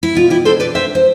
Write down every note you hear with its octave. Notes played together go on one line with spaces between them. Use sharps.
E4
B2 F4
E4 G4
D4 A4 C5
B4 D5
D4 C5 E5
C5